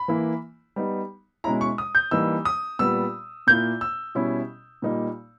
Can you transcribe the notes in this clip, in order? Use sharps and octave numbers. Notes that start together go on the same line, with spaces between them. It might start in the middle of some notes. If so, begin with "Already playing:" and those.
Already playing: B5
E3 A#3 E4
G3 B3 D#4
B2 G#3 C#4 E4 A#5
C#6
D#6
G6
E3 G3 A#3 D#4 E6
D#6
A#2 G3 B3 E6
A#2 A#3 E4 G6
E6
B2 G3 C#4 E4
A#2 G3 A#3 D#4